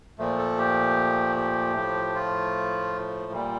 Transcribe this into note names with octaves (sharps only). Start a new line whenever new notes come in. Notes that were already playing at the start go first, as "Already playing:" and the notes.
A#2 F3 A3
A4
G4
G4
A2 F3 A3
F4
A#2 G3